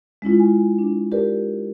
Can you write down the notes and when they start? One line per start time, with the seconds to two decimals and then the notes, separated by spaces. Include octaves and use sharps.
0.22 G#3 C#4 E4 F4
0.40 G#5
0.79 D4
1.12 G4 A#4 B4 D5